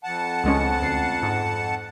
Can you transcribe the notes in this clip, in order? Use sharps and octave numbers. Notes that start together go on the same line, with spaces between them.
F2 F#5 A5
C#2 G#3 C#4
D2 C7
G#2